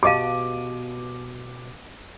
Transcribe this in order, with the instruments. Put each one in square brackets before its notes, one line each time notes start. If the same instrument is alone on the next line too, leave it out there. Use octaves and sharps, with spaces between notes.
[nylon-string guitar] B2 F#4 A5 [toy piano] G4 D#5 F5 [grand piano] D6 D#7